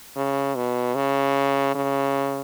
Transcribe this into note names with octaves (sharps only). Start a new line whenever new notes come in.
C#3
B2
C#3
C#3